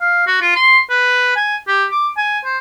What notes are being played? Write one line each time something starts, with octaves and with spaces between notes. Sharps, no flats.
F5
F#4
F4
C6
B4
G#5
G4
D6
G#5
C5